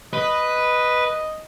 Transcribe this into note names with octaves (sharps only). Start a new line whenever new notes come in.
B4 D#5